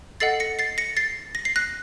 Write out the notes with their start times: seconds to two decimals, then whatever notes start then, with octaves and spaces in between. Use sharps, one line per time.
0.20 A4 D#5 F#5 A6 C7
0.40 A#6 C#7
0.59 A6 C7
0.78 A#6 C#7
0.97 A6 C7
1.35 A#6
1.45 C7
1.56 F#6 A#6